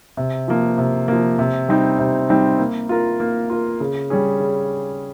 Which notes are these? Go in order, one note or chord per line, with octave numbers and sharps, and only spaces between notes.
C3
F3 A#3
C3
F3 A#3
C3
G3 C4 D#4
C3
G3 C4 D#4
A#3
F4 A#4
A#3
F4 A#4
C#3
G3 C#4 G#4
C#3